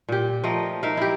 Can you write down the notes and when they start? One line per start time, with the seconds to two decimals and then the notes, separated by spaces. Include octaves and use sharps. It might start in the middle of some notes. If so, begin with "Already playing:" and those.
0.09 A#2 G4
0.44 F3 A3 A#4 D#5
0.83 D#4 A#4 E5 F5
0.97 E4 G4